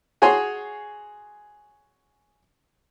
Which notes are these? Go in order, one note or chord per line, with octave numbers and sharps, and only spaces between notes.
F#4 G#4 C#5 G#5 C6